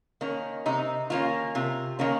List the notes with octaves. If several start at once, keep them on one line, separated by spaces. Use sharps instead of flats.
D#3 A#3 C#4
C3 D#4
D#3 A#3 C#4 F4
C3 F4
D#3 A#3 C#4